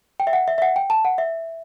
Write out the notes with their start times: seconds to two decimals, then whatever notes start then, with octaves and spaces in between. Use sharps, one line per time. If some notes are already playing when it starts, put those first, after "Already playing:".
0.20 G5
0.27 E5
0.33 F#5
0.48 E5
0.58 E5
0.62 F#5
0.76 G5
0.90 A5
1.05 F#5
1.18 E5